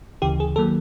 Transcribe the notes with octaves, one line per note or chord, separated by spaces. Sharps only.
D2 C#3 E3 G4
G#4
D#3 F#3 A#3 A4